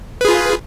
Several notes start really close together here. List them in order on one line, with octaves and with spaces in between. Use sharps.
B4 G#4 F4